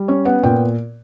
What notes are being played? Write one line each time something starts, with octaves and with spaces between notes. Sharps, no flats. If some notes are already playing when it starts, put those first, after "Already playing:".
Already playing: G3
C#4 C#5
B3 F#5
A#2 G5